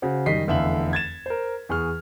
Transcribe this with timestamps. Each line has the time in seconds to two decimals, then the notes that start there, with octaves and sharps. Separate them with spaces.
0.02 C#3 F#4 C5
0.26 F#2 D#3 G3 D#5 B6 C7
0.47 F1 E2 D3 E5 F5 F#7
0.93 G#6 A6 E7
1.26 A#4 C5
1.69 E2 G#4 C#6 F6